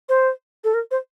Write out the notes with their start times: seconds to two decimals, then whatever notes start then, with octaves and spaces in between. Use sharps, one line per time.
0.09 C5
0.64 A4
0.74 A#4
0.91 C5